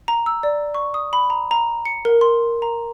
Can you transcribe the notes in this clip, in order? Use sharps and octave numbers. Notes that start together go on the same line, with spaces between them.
A#5
E6
D5
C#6
D#6
B5
A#5
A#5
C#7
A#4
C6
A#5